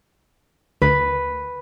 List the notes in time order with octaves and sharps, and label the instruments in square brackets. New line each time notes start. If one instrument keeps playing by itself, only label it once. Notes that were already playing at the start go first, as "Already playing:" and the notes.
[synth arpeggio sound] D2 [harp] B4